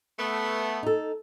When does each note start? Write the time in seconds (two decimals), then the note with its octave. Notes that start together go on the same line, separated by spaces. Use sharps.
0.19 A3 B3
0.83 D#4 A4